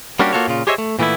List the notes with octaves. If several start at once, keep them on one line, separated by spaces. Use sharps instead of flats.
G3 A#3 C#4 D4 F#4 G4
A#3 C#4 F4 F#4 A4 C#5
A#2 C#3 F4
G4 G#4 C5 C#5 D#5 E5
A3
A#2 E3 A3 B3 E4